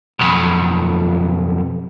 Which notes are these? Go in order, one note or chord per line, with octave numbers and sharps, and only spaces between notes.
B1 F2